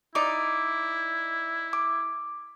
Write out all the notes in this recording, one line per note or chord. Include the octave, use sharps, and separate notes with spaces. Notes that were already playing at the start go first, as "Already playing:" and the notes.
D#4 E4 D5 D6
D6